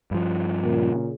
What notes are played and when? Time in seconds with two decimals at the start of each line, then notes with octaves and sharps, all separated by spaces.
0.11 G2 F3
0.64 A#2 C#3